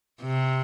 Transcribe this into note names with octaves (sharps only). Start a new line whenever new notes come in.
C3